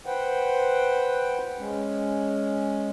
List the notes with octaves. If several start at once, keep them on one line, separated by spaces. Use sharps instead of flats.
B4 C5 F#5 G5
G#3 C#4